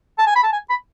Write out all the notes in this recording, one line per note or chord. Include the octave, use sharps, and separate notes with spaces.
A5
G#5
B5
A5
G#5
B5